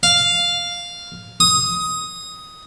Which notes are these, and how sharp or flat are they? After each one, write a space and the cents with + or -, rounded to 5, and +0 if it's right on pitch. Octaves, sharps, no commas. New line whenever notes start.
F5 +0
D#6 +15